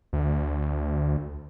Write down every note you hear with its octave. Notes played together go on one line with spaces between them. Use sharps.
D2